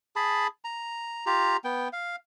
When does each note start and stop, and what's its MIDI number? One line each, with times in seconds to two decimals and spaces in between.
0.16 0.47 68
0.16 0.47 81
0.16 0.47 83
0.65 1.25 82
1.26 1.57 65
1.26 1.57 67
1.26 1.57 82
1.64 1.88 59
1.64 1.88 79
1.93 2.16 77